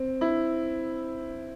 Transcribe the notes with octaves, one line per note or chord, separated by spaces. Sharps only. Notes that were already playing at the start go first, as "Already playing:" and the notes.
Already playing: C4
E4